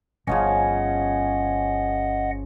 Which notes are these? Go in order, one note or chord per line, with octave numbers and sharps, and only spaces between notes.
G1 C#3 F3 C#4 D#5 F#5